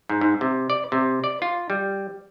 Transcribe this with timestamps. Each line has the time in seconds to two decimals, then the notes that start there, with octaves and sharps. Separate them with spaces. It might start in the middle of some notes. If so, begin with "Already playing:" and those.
0.10 G#2
0.21 G#2
0.41 C3
0.70 D5
0.92 C3
1.24 D5
1.42 F4
1.70 G3